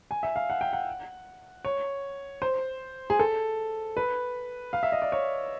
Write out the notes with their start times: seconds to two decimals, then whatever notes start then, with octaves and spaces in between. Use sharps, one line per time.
0.11 G#5
0.23 E5
0.36 F5
0.50 F#5
0.61 G5
0.73 F#5
1.65 C#5
2.42 C5
3.10 G#4
3.19 A4
3.97 B4
4.73 F5
4.83 E5
4.92 D#5
5.02 D5
5.12 C#5